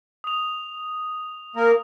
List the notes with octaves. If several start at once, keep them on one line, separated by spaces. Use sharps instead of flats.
D#6 F7
A#3 A#4